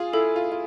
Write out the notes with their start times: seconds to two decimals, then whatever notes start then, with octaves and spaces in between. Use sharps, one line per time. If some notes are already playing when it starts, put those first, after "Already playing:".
Already playing: F4 G#4
0.13 E4 A4
0.36 F4
0.52 F4